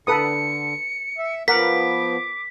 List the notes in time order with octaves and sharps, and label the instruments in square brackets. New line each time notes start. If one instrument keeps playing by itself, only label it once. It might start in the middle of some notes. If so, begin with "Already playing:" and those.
[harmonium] D3 [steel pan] A4 B4 D#6 [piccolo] C#7
[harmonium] E5
[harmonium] F3 B3 [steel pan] A#4 F#5 [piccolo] D6 [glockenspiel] B6